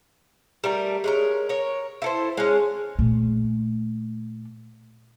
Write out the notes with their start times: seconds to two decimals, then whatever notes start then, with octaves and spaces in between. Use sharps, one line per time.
0.64 G3 A3 A#4
1.04 G#3 C#4 A#4
1.49 A#4 C#5
2.02 E4 A4 C5
2.37 G#3 C#4
2.99 A#2 A3